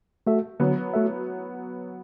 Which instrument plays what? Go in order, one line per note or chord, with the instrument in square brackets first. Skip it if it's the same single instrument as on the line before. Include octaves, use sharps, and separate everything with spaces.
[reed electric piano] A3 F#4 A4 E5
[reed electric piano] D3 [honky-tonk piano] F#3 B3
[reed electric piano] A3 F#4 A4 E5